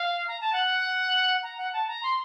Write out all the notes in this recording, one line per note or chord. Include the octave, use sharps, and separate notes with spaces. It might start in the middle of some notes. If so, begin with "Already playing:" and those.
Already playing: F5
A#5
A5
F#5
A#5
F#5
A5
A#5
C6